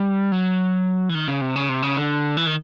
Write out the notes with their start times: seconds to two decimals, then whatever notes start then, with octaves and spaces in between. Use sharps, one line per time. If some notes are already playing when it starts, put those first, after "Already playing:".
Already playing: G3
0.32 F#3
1.09 E3
1.15 D#3
1.28 C#3
1.41 C3
1.56 C#3
1.69 C3
1.82 C#3
1.97 D3
2.37 E3
2.47 D#3